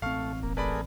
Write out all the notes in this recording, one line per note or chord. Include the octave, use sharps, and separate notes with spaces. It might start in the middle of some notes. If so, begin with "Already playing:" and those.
A1 A3 C4 F5 C#6 F6
E1 A#3
A3 G#4 A#4 B4 D5 B5